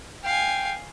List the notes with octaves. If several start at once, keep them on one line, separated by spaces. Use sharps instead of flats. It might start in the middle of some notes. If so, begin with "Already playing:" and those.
F5 G5 G#5